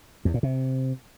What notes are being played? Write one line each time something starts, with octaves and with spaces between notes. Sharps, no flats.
E2
A#2
C3